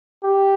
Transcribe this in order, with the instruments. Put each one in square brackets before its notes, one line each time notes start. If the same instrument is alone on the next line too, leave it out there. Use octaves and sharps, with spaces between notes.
[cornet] G4